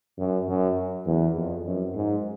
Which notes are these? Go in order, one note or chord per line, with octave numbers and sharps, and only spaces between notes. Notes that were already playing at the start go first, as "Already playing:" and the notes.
F#2
F#2
E2
F2
F#2
G#2